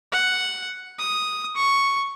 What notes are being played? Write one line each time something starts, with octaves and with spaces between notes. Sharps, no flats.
F#5
D#6
C#6